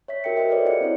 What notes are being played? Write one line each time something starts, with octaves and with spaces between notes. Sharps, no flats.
C#5 E5 B6
F#4 A#4 E5 G5 C#7
F#4 A#4 C5 D#5 E5 G5
A4 B4 C#5 D5
F4 G#4 C5 D#5 F#5 C#7
C4 E4 C#5